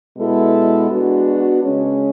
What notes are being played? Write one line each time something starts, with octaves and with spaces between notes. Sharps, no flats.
B2 G#3 B3 E4 A4
G#3 B3 D4 F#4
C#3 G#3 C#4